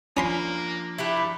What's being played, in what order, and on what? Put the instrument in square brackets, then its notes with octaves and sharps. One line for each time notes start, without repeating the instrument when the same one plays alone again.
[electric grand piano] F3 D4 [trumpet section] A#3 [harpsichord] C#4 B5 C6
[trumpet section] A3 [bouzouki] E4 G4 B4